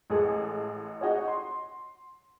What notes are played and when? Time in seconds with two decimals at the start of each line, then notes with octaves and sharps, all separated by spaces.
0.10 A1 G#3 G#4 A4
1.01 D#4 F#4 G#4 C#5
1.28 C6